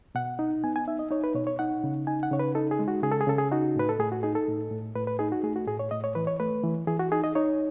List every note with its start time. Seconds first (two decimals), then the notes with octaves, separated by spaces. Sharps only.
0.15 B2 F#5
0.39 D#4
0.64 B3 G#5
0.76 G#5
0.87 D#4 E5
0.99 D#5
1.11 D#4 C#5
1.24 B4
1.35 B2 C#5
1.47 C#5
1.59 D#4 F#5
1.84 C#3
2.07 D#4 G#5
2.23 F#5
2.31 C#3 C#5
2.40 B4
2.55 D#4 A4
2.71 G#4
2.79 G#3
2.88 F#4
3.03 C#3 G#4
3.12 A4
3.21 G#4
3.27 C#3 A4
3.38 G#4
3.52 D#4 F#4
3.76 A2 B4
3.89 A4
3.99 A2 G#4
4.12 F#4
4.23 D#4 G#4
4.35 A4
4.48 A2
4.71 A2
4.95 A2 B4
5.07 B4
5.19 D#4 G#4
5.32 F#4
5.43 A3 G#4
5.56 F#4
5.67 A2 G#4
5.79 C#5
5.91 A2 D#5
6.04 C#5
6.15 E3 B4
6.27 C#5
6.40 A3 B4
6.64 E3
6.87 E3 G#4
7.00 F#4
7.12 D#4 G#4
7.24 D#5
7.35 D#4 C#5